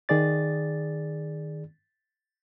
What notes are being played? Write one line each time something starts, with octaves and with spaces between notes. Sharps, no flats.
D#3 G#4 D5 A6